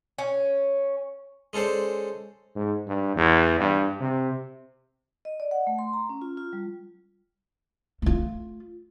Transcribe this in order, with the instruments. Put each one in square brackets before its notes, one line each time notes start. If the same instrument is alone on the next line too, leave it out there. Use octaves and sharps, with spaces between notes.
[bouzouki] C#4
[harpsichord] G#3 C#4 A4 C5 D5
[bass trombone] G#2
G2
E2
G2
C3
[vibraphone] D#5
D5
F#5
A3
C6
A#5
C#4
F4
F4
G3
[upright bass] A3 F4